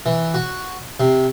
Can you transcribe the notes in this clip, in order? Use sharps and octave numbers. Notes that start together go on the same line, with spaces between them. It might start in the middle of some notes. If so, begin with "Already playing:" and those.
E3
F#4
C3